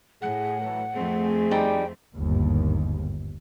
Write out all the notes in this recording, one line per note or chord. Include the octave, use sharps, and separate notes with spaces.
A2 G#4 F#5
E3 F#3 A4
F2 A3 C4 G#4
G3 D#4 G5
G1 D#2 G#2